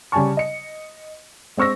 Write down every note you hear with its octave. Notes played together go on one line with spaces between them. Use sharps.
C#3 G3 G#5 A5 C#6
D#5 C#7
G#3 C4 C#6 E6 A#6